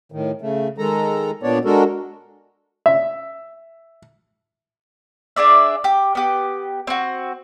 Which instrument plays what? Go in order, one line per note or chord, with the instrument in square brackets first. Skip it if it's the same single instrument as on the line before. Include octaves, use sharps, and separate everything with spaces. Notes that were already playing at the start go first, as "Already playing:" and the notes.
[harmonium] A2 D#3
C#3 A3
D#3 G#3 A4 A#5
A#2 B3 D4 C#5 D5
G#3 D4 F#4 A4 A#4
[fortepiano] E5
[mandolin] D4 G#4 D5 E5
G4
B3 G4
C4 F#4